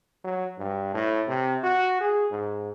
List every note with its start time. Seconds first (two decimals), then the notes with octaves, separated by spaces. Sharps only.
0.24 F#3
0.59 G2
0.94 A2
1.28 C3
1.63 F#4
2.01 G#4
2.31 G#2